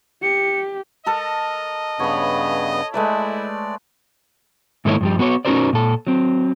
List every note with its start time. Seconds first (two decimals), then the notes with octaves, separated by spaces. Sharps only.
0.22 G4 C#7
1.06 A4 A#4 D#5
1.99 G2 C#3 B3 C#5 B5
2.94 G#3 A3 E4 B4 D5
4.85 G#2 D#3 A3 A#3 E4 C#5
5.01 G2 F3 G3
5.19 B3 F#4 B4 C#5
5.45 C#4 D#4 F#4 A#4 C5 D5
5.73 A#2 A4
6.07 F#3 C4